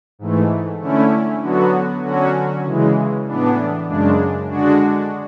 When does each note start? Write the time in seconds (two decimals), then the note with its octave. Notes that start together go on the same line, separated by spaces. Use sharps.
0.19 G#2 E3 A3
0.80 D3 A3 C#4 E4
1.42 D3 F#3 B3 F#4
2.04 D3 F#3 C#4 F#4
2.65 C#3 E3 G#3
3.27 A2 E3 B3 D4
3.88 F#2 C#3 G#3 D4
4.50 D3 G#3 D4 F#4